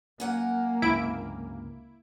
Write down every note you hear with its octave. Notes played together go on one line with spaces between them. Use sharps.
F#2 A#3 F#5 G#5
C#2 G2 C3 E4 D7